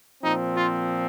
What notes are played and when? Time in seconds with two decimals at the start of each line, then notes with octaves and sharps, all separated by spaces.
0.23 A#2 F3 C4 D#4
0.56 F4